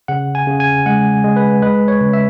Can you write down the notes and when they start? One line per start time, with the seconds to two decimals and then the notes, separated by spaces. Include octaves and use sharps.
0.08 C#3 F#5
0.35 G#5
0.47 C#3
0.60 G#5
0.86 G#3 F#5
1.24 G#3
1.36 B4
1.62 G#3 B4
1.88 C#5
2.01 C#3
2.13 E5